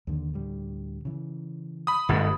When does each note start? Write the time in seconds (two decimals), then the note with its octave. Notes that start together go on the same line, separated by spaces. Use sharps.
0.07 D#2 D3
0.34 D2 A2 G3
1.05 C#3 E3
1.87 B5 D#6
2.09 G1 G#2 D3 A3